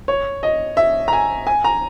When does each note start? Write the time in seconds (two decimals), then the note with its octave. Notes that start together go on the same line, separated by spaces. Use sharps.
0.08 C#5
0.43 D#5
0.77 E5
1.08 A#5
1.13 G#5
1.47 G#5
1.64 A#5